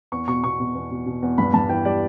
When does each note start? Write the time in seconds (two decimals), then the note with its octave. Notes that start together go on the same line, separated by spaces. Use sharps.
0.12 E2 C#6
0.28 B2 C#6
0.44 B2 C#6
0.60 B2
0.75 E2
0.91 B2
1.06 B2
1.22 E2
1.38 G2 B5
1.54 G2 A5
1.69 E3 G5
1.85 G3 D5